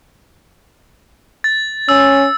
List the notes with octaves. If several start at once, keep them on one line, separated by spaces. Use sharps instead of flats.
A6
C#4 E6